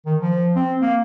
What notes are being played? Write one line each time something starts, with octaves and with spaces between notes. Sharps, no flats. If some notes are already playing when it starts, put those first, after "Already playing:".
D#3
F3
C4
A#3